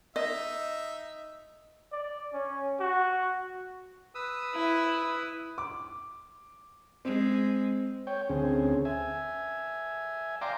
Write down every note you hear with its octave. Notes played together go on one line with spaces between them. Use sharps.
D#4 D#5 E5
D5
C#4
F#4
B4 D#6 E6
E4
D6
G#3 C4
C#5 G5
D2 C4 C#4 G#4
E5 G#5
D5 F5 G5 A#5 C6 D6